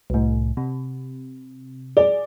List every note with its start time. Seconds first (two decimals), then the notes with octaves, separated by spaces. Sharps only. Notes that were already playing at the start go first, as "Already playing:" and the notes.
0.10 C2 A2
0.57 C3
1.97 G#4 D5